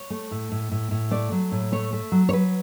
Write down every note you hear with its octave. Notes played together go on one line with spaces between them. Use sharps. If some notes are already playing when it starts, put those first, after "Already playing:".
Already playing: C#5
A3
A2
A2
A2
A2
A3 D5
F#3
A2
A3 C#5
A3
F#3
C#5
F#3 B4